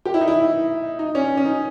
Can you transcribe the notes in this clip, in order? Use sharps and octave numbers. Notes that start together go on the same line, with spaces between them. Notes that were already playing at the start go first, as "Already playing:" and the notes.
G4
E4
D#4
E4
D#4
C#4
C#4
D#4